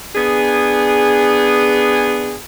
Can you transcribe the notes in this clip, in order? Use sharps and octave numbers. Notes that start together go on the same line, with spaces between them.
B3 D4 G#4